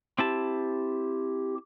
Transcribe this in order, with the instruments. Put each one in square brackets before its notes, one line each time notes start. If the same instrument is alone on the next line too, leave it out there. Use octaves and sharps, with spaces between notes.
[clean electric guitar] C4 E4 A5 [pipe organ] G4